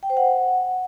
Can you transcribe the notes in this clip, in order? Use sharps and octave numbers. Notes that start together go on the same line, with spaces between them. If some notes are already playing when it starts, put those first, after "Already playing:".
G5
C5
F#5